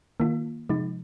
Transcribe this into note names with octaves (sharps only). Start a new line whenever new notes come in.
D#3 A#3 F4
C3 F3 G#3 D#4